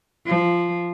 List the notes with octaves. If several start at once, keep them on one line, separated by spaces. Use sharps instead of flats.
F3